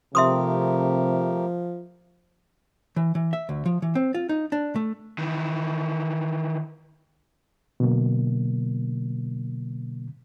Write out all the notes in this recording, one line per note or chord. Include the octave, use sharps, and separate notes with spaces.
C3 F3 A3 G4 A#4 E5 C6 D#6
E3
E3
E5
D2
F3
E3
C4
F4
D#4
D4
A3
D#3 E3
B2 D3 F#3 A#3